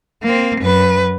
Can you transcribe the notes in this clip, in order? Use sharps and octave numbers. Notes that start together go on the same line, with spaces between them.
A#3 C4
F#2 B4